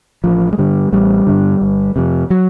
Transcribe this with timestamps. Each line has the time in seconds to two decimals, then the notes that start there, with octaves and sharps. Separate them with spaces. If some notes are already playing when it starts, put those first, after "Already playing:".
0.24 A1 F3
0.53 G#3
0.58 G2 D3 G3
0.92 A1 G3
1.27 G2 D3
1.61 G1
1.96 F2 C3
2.30 F#3